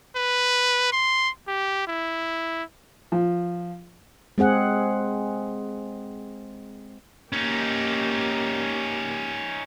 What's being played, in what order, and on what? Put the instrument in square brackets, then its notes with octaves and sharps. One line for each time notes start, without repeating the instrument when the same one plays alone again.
[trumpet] B4
C6
G4
E4
[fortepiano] F3
[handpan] G#3 C4 G#4 F#5
[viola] A#3 G4 [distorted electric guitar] C#4 D#4